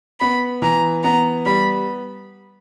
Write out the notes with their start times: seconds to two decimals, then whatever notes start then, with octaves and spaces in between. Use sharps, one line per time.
0.20 B3 B5
0.62 E3 A#5
1.04 B3 A#5
1.46 G3 B5